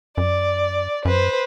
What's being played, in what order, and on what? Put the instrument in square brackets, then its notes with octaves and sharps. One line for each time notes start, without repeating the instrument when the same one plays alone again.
[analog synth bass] F#2 [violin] D5
[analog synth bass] F#2 [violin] B4 C5